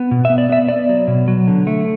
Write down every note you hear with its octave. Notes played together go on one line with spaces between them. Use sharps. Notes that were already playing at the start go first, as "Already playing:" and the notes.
Already playing: B3
B2
B3 E5
D5
B3 E5
B3 D5
F#3
B2
F#3
D3
A3